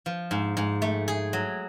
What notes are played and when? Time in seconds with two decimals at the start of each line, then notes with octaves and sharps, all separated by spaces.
0.06 F3
0.31 G#2
0.57 G#2
0.82 A3
1.08 G#4
1.33 F#3